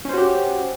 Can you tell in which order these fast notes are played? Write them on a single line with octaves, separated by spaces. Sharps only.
C#4 C5 F#4 G4